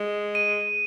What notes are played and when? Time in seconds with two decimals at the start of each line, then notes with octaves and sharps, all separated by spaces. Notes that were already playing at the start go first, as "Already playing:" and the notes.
Already playing: G#3
0.35 D#7